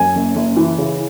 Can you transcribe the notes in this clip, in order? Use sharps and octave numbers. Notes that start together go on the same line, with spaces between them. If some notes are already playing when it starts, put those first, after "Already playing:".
Already playing: F#2 G#5
F#1
F#1
E3
C#3